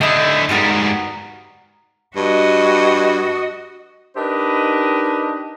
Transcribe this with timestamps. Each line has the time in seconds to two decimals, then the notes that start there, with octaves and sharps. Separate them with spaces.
0.01 D3 D#4 E4 G6
0.49 G#2 G3 B3 F#4 A#4
2.16 G2 F#4 D#5
4.17 D4 D#4 G4 A#4 B4 D#5